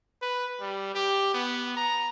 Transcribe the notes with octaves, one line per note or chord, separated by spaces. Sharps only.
B4
G3
G4
B3
A#5